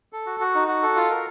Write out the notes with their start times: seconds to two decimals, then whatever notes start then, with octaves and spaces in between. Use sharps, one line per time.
0.13 A4
0.26 F#4
0.40 F#4
0.55 D#4
0.68 F#4
0.82 A4
0.96 F4
1.10 A#4